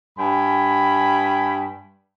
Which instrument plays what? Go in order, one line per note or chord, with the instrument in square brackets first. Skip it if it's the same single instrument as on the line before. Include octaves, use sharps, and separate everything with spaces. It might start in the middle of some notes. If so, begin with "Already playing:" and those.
[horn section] G2 G5 G#5 B5